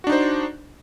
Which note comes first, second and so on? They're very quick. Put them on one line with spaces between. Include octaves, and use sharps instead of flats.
F#4 D4 D#4 C5